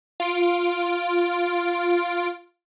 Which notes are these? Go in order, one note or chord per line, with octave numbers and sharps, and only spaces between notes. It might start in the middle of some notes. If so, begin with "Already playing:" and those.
F4 D7